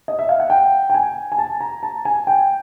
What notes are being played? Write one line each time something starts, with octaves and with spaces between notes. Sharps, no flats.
D#5
E5
F5
F#5
G5
G5
G#5
G#5
A5
A#5
A5
G#5
G5